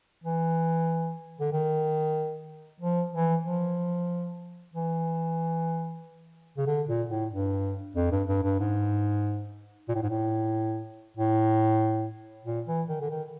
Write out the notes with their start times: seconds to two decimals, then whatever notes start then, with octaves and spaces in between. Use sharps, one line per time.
0.24 E3
1.40 D3
1.52 D#3
2.80 F3
3.13 E3
3.44 F3
4.74 E3
6.57 C#3
6.67 D3
6.88 A#2
7.10 A2
7.31 G2
7.95 F2
8.11 G2
8.28 G2
8.43 G2
8.59 G#2
9.89 A#2
9.95 A2
10.02 G#2
10.09 A2
11.17 A2
12.45 A#2
12.67 E3
12.88 D#3
13.01 D3
13.10 D#3